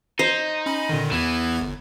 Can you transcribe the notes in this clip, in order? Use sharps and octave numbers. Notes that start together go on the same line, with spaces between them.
D#4 C5
C#4 B5
A#2 D3 D#3
E2 E3 B3 G#6
G1